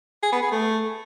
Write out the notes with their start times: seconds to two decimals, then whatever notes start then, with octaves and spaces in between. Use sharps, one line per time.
0.23 G#4
0.32 B3
0.42 G#4
0.52 A3